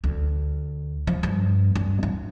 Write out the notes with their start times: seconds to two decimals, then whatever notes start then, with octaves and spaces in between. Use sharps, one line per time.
0.04 D2
1.07 F3
1.23 G2
1.76 G2
2.03 D#4